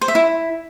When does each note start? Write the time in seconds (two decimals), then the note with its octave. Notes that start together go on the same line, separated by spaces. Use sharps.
0.01 C5
0.08 E5
0.15 E4